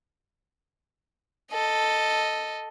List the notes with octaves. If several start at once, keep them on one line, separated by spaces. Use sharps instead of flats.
A4 D#5